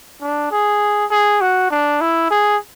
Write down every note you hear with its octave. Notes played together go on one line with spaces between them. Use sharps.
D4
G#4
G#4
F#4
D4
E4
G#4